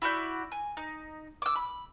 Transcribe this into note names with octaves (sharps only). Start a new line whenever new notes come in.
E4 F#4 D5 G6
G#5
D#4
D6 E6
B5